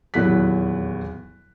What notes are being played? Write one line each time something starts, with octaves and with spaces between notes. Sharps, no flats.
D#1 E2 F#3 E4 F#6 B6